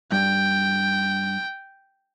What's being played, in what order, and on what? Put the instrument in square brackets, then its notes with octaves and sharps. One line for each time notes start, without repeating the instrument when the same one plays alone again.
[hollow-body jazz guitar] G2 [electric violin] G5